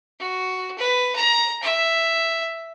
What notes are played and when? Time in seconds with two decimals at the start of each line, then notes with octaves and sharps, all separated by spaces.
0.20 F#4
0.78 B4
1.15 A#5
1.62 E5